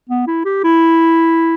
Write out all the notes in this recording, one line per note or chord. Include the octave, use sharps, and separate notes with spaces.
B3
E4
G4
E4